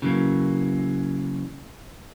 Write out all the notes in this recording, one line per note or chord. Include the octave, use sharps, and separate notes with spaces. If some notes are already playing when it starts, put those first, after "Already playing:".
C#3 E3 F#3 A#3